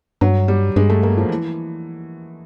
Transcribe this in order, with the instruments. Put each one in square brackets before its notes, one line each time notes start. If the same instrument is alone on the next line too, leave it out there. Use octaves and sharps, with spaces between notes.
[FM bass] G2 [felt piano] F#3
[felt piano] G3
[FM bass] G2 [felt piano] G#3
[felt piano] A3
A#3
F3
E3